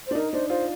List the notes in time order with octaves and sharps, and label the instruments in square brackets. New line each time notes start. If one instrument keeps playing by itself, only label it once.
[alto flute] C5
[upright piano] D4
[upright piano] D#4 [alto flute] A#4
[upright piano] D4 [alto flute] C5
[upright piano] F4 [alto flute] C5